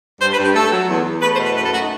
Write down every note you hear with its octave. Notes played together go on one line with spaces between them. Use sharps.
G2 C5
B4
G2
G4
A3 A4
F#3
E2
E2
A3 B4
C5
B2
B4
F#2 B4
A4
A3 F#4
D#4